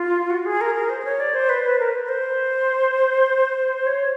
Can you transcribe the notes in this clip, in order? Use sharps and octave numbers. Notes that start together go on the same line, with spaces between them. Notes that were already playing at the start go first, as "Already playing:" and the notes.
Already playing: F4
F#4
G#4
A#4
A#4
C5
C5
C#5
D5
C5
B4
B4
A#4
B4
B4
C5
C#5